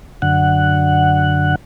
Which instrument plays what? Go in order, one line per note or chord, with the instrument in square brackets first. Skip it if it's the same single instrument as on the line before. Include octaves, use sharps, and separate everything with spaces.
[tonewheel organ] F#2 D3 F#5